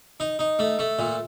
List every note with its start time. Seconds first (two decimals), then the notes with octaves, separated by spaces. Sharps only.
0.20 D#4
0.39 D#4
0.59 A3
0.79 A3
0.99 A#2